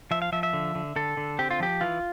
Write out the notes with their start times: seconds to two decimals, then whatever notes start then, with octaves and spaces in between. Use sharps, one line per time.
0.11 F3 E5
0.22 F5
0.32 F3 E5
0.43 E5
0.53 D3
0.75 D3
0.96 D3 A4
1.17 D3
1.39 C4 G4
1.51 F4
1.60 F3 G4
1.81 E3 F4